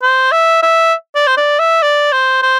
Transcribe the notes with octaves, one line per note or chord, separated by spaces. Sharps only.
C5
E5
E5
D5
C5
D5
E5
D5
C5
C5